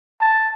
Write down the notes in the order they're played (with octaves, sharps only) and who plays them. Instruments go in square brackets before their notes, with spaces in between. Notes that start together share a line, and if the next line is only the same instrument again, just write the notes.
[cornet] A5